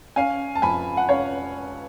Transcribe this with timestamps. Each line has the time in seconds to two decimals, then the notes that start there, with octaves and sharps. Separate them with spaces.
0.16 C#4 F5 G#5
0.55 A5
0.62 F2 G#5 B5
0.97 F#5
1.09 C#4 C#5 F5